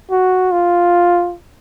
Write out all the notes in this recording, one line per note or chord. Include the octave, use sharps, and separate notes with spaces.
F#4
F4